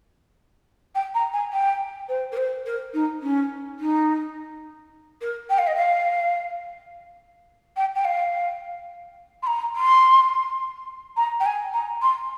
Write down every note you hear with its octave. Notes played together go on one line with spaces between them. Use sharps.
G5
A#5
G#5
G5
C5
A#4
C5
A#4
D#4
C#4
D#4
A#4
G5
F5
D#5
F5
G5
G5
F5
C6
A#5
C6
A#5
G5
G#5
A#5
C6